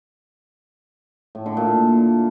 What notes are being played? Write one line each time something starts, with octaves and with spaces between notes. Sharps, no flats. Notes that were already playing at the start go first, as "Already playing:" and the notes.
A2
D3
A#2